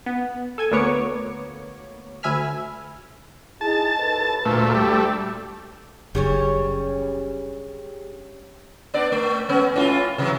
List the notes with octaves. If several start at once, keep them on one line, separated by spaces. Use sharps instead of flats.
B3
A4 G#5 G#6
D2 A#3 B3 C#5 D6 C#7
D2 E5 G#5 B5 F6
D#4 E4 G#4 A5
D#2 A4 B4
D2 A#2 A3
G3 A3
F#1 G3 C#4 D4 G4 G#4 C#5
B3 D4 D5
A3
G#3 B3 C#4
A2 C#4 F4
C3 E3 F#3